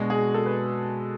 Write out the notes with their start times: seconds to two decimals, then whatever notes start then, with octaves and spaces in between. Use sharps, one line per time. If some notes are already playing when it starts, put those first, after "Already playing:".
Already playing: B2 G#3 D4 F#4
0.10 G#4
0.34 A4
0.46 B4